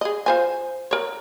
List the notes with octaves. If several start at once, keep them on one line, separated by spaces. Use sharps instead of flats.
G#4 D#5
F4 C5 G#5
A#4 C#5